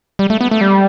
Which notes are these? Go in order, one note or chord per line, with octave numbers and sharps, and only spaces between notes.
G3
A3
B3
A3
G3